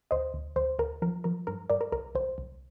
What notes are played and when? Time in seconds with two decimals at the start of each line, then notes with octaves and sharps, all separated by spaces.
0.11 D2 C5 D#5
0.34 D2
0.56 D2 C5
0.79 D2 A#4
1.02 F3 A#4
1.24 F3 A#4
1.47 G2 A#4
1.70 G2 A#4 D5
1.81 A#4
1.92 C2 A#4
2.15 C2 C5
2.38 C2